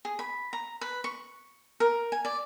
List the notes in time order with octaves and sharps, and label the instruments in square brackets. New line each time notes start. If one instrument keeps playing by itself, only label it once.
[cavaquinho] G#4
B5
A#5
B4
C#6
A#4
G#5
D5